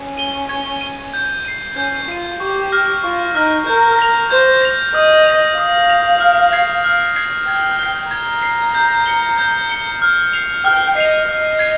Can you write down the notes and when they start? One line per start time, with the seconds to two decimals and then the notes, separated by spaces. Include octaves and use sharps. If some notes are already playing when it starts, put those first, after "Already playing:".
Already playing: C#4
0.18 D#7 G7
0.49 G#6
0.81 D#7 G7
1.14 G6
1.45 C7 D#7
1.76 C#4 G6
2.08 F4 C7 D#7
2.40 G4 C#6
2.72 F6 A#6
3.03 F4 C#6
3.35 D#4 F6 A#6
3.67 A#4 G6
3.99 A#6 F7
4.30 C5 G6
4.62 A#6 F7
4.94 D#5 D#6
5.26 A#6 F7
5.57 F5 D#6
5.90 A#6 F7
6.20 F6
6.52 G#6 C7
6.84 F6
7.16 G#6 C7
7.47 G5 G#6
7.79 C7 G7
8.11 A#5 G#6
8.42 C7 G7
8.74 G6
9.06 C#7 G7
9.38 G6
9.70 C#7 G7
10.02 F6
10.33 C7 F7
10.65 G5 F6
10.96 D#5 C7 F7
11.28 D#5 F6
11.59 G#6 C7